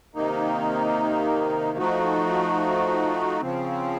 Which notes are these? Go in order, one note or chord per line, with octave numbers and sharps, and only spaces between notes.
C3 D#3 A#3 D#4
F3 A3 D#4 F#4
C#3 F3 C4